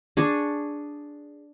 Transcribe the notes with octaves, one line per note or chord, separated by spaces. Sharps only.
D4 G#4 A5 C#6